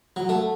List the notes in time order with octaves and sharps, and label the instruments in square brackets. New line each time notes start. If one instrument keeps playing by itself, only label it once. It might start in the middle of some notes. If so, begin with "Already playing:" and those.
[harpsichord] F#3
A3